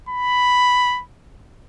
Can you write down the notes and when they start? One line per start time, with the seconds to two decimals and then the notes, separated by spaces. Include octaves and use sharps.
0.09 B5